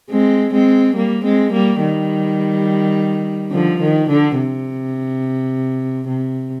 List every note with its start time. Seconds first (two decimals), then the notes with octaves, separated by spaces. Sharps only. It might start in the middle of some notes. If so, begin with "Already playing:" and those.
0.10 G#3 C4
0.53 G#3 C4
0.95 G3 A#3
1.24 G#3 C4
1.52 G3 A#3
1.81 D#3 G3
3.52 D3 F3
3.80 D#3
4.09 D3
4.37 C3
6.08 C3